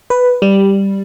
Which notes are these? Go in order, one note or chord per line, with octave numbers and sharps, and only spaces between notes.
B4
G3